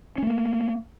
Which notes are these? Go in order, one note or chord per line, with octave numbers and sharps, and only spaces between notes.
A3 A#3 C#4